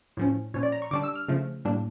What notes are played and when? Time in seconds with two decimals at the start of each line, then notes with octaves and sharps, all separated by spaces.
0.17 A2 F3 C#4
0.54 A#2 F3 C#4 C#5
0.63 D5
0.72 A#5
0.82 C#6
0.91 D3 G3 D4 D6
1.03 E6
1.16 F6
1.28 C#3 F3 A3
1.65 A2 G3 A#3 D4